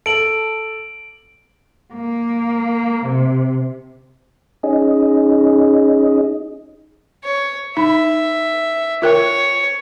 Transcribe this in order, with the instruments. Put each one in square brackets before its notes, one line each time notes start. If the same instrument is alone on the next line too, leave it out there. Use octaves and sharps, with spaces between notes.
[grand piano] A4 [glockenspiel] D7 F#7
[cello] A#3
C3
[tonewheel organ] C#4 D#4 G#4 D#5
[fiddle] C#5
[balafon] D#4 B5 [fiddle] E5
[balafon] F4 A#4 G5 [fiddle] C#5